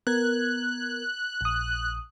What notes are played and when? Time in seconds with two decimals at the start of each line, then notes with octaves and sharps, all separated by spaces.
0.07 B3 A#4 F#6 G#6
1.41 A#1 D#6